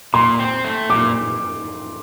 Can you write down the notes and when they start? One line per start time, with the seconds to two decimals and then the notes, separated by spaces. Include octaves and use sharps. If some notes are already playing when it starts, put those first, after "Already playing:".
0.14 A#2 C6
0.39 C4
0.64 A3
0.90 A#2 D6